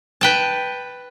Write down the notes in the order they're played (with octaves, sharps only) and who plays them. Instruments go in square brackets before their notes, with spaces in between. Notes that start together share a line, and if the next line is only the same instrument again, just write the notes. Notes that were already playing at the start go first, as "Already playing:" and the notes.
[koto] B4 G5 A5